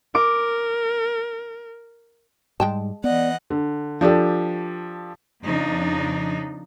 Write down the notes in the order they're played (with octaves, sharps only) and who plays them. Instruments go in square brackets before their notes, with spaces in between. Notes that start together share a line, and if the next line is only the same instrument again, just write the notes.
[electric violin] A#4 [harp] D6 D7
[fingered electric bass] G#2 G3 [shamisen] G#3 G5 A5
[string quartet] E3 D#5 F#5 [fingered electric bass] B3 [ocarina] D5
[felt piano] D3
F3 D4 G4 A4
[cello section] F2 C#3 D4 D#4